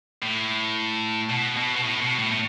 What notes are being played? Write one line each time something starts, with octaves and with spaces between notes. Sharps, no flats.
A2
B2
B2
B2
A2
B2
A2
A2